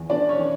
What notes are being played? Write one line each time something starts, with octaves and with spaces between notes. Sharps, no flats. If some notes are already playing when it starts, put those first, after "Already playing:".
Already playing: E2
E3 D4 D5
C#4 C#5
E3